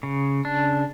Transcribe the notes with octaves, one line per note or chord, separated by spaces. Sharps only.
C#3
D4